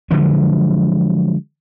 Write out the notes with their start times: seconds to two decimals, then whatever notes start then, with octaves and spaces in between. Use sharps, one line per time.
0.11 D3 F3 F#3 G#3